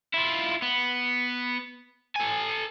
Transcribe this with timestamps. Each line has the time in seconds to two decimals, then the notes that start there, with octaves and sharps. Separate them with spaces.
0.14 E4 F4
0.62 B3
2.16 A4 G#5